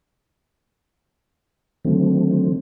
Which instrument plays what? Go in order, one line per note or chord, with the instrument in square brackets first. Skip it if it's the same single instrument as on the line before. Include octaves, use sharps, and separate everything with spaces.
[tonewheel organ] D3 D#3 F#3 A3 C4